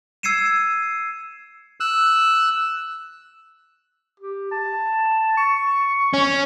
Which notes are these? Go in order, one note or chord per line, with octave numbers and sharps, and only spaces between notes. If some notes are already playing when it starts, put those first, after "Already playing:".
E6 G#6 C7 C#7 D#7 E7
E6 F#6
G4
A5
C#6
C#4